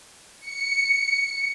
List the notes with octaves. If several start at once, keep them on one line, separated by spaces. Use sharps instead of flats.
C#7